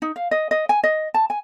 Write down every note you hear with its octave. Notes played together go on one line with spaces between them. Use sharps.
D#4
F5
D#5
D#5
G#5
D#5
A5
G#5